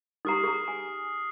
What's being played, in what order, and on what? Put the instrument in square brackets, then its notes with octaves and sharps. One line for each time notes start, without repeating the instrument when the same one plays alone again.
[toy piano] D#4 G4 A#5 [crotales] D#6 F6 C7
[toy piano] G#4 A#5
G#5